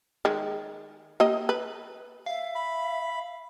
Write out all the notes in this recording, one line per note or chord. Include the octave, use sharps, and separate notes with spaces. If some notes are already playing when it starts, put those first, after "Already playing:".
D#3 G#3
A#3 G4 D#5
B4
E5 F5
B5